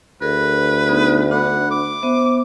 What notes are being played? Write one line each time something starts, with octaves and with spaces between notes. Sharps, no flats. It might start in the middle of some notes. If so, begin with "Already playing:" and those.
D2 G#4 A#4 B4
B3 D#4 G#4
D4 F#5 B5
D6
B3 C5 E5